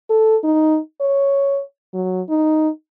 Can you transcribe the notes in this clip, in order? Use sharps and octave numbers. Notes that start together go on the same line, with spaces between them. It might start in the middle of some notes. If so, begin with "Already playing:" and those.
A4
D#4
C#5
F#3
D#4